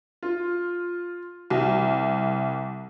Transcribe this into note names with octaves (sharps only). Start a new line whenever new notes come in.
F4
C2